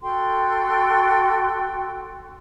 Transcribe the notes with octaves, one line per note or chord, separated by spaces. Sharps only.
F#4 A4 G5 C6